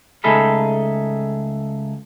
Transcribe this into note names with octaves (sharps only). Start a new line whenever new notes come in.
C#2 A3 D#4 G#4 A4 B5